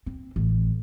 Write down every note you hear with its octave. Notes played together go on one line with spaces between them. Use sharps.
C4
A1